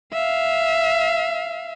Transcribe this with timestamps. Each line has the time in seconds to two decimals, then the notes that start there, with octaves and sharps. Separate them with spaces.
0.13 E5 F5